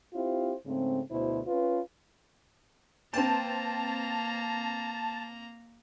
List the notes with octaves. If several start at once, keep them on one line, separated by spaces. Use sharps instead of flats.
C4 E4 F4 G4 C5
G#2 C#3 A3 C4
D2 B2 E4 C5
C#4 F4 B4
A#3 C4 B4 G5 A5 A#5